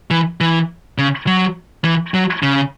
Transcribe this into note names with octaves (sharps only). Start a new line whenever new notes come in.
E3
E3
C#3
F#3
E3
F#3
C#3